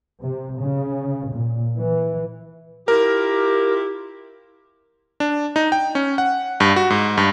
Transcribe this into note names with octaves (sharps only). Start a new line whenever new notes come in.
C3
C#3
A#2
E3
E4 F4 G4 A#4
D4
D#4
G5
C#4
F#5
G2
F#4
G#2
G2